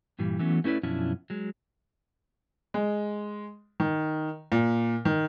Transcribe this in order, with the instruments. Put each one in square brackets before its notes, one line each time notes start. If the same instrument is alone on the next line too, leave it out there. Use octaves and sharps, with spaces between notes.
[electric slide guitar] G2 A#2 E3 G3
E3 F#3 A3 B3 C#4
A3 C#4 E4 B4 D5
F#2 B2 F3 C#4 D4 E4
F#3 G#3
[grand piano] G#3
D#3
A#2
D#3